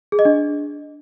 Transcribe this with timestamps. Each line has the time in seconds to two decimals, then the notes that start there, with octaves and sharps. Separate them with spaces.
0.12 G#4
0.19 D#5
0.25 D4